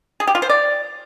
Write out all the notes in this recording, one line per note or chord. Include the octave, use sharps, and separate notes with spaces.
G#4
G4
F4
C5
D5